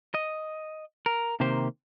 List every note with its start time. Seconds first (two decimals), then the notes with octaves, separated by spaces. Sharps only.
0.14 D#5
1.06 A#4
1.40 C3 D#3 A#3 G4 C5